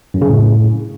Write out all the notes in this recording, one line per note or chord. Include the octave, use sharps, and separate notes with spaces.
F#2
C#3
A2